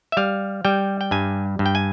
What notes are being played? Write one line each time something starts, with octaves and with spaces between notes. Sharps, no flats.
E5
G3 F5
G3 G5
G5
G2 G#5
G2
G5
G#5